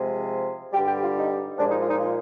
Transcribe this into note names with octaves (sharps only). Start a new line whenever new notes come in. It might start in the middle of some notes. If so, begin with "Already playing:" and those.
Already playing: C3 F3 G#3
G2 D3 G3 G4
G4
F4
D#4
A#2 F3 G#3 D4
D#4
F4
D#4
F4